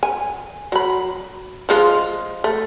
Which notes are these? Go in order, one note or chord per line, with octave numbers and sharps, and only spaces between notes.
G#5
F#3 B5
F3 G#3 F4
A3